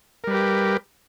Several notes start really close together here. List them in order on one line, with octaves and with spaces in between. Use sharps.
A#4 G3 B4 G4